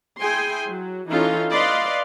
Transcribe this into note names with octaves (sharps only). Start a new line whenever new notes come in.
E4 G#4 G5 G#5 C6
F#3
E3 C#4 D#4 F4 A4
B4 D5 D#5 F5 C6